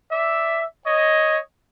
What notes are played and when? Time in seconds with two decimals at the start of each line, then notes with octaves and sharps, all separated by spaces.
0.11 D5 E5
0.85 C#5 D#5